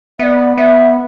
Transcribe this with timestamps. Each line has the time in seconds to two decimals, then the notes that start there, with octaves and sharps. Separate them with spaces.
0.19 B3 D5 E5
0.57 B3 E5